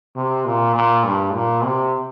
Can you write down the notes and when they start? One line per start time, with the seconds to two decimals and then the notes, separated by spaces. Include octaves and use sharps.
0.16 C3
0.45 A#2
0.75 A#2
1.04 G2
1.34 A#2
1.63 C3